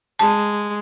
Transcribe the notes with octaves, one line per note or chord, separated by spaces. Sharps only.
G#3 A5